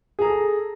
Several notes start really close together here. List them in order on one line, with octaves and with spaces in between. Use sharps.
G#4 A#5 A4